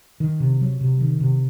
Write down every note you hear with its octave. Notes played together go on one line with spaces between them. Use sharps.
D#3
C3
F#3
C3
D#3
C3